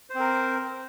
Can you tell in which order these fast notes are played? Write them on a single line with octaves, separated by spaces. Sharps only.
C5 C4 A#4